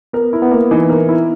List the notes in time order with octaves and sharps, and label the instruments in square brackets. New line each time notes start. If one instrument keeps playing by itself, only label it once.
[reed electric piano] B3 [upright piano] A#4
[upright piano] E4
[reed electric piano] B3
[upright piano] A#3
[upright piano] E3 [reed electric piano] D#4
[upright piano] A#4
E4